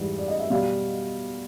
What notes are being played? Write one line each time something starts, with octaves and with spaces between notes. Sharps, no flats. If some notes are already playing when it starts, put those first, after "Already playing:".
Already playing: G#2 E3 G3
D5
D#5
E5
B2 G3 F5